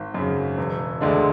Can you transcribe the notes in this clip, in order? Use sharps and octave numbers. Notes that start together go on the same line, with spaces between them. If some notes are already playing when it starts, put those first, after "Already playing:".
Already playing: G#1
F#2 C#3
E1
D2 D3 G#3 D4